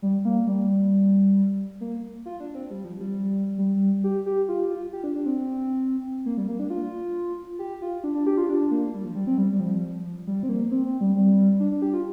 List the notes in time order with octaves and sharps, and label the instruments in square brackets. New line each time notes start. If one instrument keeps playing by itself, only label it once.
[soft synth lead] G3
A#3
G3
A#3
F4
D4
C4
G3
F3
G3
G3
G4
G4
F4
F4
G4
D4
D4
C4
A#3
G3
A#3
D4
F4
G4
F4
D4
D4
G4
F4
D4
A#3
G3
F3
G3
C4
G3
G3
F3
G3
C4
A#3
C4
C4
G3
G3
D4
D4
G4
F4